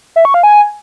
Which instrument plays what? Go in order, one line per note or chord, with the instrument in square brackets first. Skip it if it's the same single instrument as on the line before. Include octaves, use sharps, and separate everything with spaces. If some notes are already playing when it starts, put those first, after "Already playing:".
[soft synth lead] E5
C#6
F5
G#5